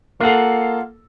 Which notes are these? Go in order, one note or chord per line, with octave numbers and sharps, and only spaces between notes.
A#3 F4 A4 F5 F#5